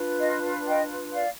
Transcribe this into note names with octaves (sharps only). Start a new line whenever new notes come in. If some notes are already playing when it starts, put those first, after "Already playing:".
Already playing: D4 F4 B4
D#5
D#5 G5
D5 F5